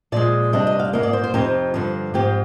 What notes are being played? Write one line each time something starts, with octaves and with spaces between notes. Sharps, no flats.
A#2 F3 G#3 D5
C3 G3 D4 D#5
D#5
F5
G#2 D#3 A#3 D#5
D5
C5
C5
F2 C3 F3 C4 D#4 G4
G2 D3 F3
G#2 F3 C4 G4